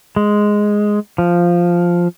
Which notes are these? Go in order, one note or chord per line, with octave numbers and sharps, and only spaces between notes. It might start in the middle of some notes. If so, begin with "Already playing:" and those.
G#3
F3